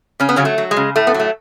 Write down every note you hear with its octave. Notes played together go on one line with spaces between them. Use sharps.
C#3 C#4
B3
C#3 F#3 C#4
A3
F#3
G#3
C#3
A2 A3
B3
F#3
A3